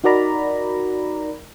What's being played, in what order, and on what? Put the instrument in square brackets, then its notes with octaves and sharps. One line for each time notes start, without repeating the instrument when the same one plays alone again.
[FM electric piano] D#4 F#4 A#4 D5 A#5 B5